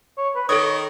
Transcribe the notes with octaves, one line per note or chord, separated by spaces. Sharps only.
C#5
B4
D#3 A4 C#5 D#6